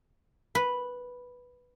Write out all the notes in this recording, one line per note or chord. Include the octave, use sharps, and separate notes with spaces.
B4